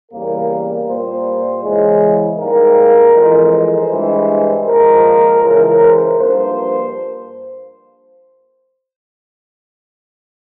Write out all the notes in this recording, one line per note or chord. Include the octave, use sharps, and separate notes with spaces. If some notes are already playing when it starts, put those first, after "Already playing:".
E2 C#3 G3 A#3 A#4
A#2 G3 A#3 C5
E2 C#3 E3 G#3
G#2 G3 A#3 A#4
F2 E3 G#3
C5
G2 E3 G#3
A#2 F3 G#3 A#4
C#2 C#3 E3 A#4
C5
G2 F3 A#3 C5